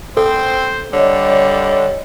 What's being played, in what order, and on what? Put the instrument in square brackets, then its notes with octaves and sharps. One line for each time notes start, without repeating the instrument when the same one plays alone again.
[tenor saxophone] C4 [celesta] A4 [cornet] C5
[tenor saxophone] D3 [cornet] G3 [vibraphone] C#5 D#5